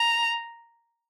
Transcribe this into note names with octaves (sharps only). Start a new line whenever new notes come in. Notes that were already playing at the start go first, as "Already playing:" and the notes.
Already playing: A#5